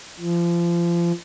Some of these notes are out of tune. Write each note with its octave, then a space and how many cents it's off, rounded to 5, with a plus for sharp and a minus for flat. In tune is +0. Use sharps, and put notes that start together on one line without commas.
F3 -30